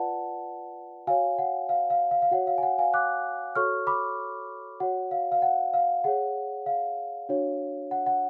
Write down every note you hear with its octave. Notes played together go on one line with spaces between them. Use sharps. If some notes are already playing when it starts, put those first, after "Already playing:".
Already playing: F4 B4 D5 F#5 A5
F#4 C#5 F5 G#5
F#5
F5
F5
F5
F5
F#4 C#5 F#5
F5
G#5
F#5
F5 G#5
D6 F#6
F#4 A4 C#5 C#6 F6
B5 D6
F#4 C#5 F#5
F5
F5
F#5
F5
G#4 C#5 F#5
F5
D4 F#4 C#5
F#5
F#5